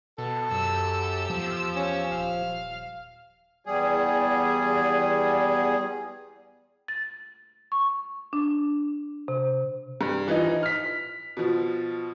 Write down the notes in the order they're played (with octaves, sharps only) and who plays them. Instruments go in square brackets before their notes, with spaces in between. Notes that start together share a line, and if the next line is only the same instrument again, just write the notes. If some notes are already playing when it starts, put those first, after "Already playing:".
[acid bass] B2 [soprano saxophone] A4
[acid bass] F#2 [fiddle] G4 E6
[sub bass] E2 [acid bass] F3
[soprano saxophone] C#4
[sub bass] D#1 [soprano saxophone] F5
[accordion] E2 G3 G#4
[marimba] A6
C#6
D4
C3
[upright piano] G2
E3 F3 D#4
F6 B6
B2 F3